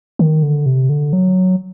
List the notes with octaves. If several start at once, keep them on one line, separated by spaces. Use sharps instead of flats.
D#3
D3
C3
D3
F#3